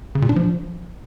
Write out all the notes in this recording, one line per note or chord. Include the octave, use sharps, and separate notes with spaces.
C#3
A#2
D4
F3